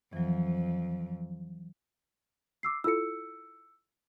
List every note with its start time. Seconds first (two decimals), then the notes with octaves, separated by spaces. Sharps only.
0.13 F2 E3 F#3
2.63 D6 E6 C7
2.84 E4 F4 A4 E6 C#7